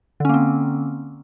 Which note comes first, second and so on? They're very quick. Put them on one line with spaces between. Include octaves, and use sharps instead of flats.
D3 C#4 A#3 C4